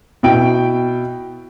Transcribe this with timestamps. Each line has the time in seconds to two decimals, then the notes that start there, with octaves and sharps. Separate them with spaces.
0.23 B2 E4 G5 D7